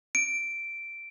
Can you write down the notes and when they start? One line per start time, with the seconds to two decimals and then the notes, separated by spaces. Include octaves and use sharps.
0.15 D7